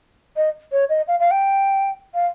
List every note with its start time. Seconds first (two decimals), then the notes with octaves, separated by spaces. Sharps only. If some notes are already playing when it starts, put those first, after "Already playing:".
0.37 D#5
0.72 C#5
0.89 D#5
1.08 F5
1.20 F5
1.31 G5
2.14 F5